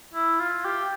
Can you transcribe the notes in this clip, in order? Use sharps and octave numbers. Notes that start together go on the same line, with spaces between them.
E4
F4
G4